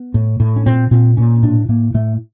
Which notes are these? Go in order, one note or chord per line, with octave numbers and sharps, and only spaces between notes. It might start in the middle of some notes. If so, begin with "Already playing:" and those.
Already playing: B3
A2
A2
C#4
A#2 C4
A#2 C4
A#2 C#4
A2 D4
A2 A#3
A2 A3